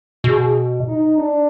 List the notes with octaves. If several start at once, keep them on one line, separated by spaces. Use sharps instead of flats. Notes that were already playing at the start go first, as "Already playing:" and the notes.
B2 G#4
D#4
D4